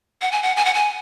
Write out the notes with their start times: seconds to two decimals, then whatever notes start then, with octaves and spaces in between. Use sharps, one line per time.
0.22 F#5
0.32 G#5
0.43 F#5
0.56 G#5
0.65 F#5
0.74 G#5